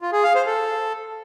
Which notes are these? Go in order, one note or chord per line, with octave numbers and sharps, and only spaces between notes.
F4
G#4
F5
C5
A4